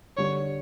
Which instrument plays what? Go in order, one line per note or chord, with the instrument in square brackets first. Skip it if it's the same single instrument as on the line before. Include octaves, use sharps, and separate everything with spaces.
[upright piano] D3 G3 D4 [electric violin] C#5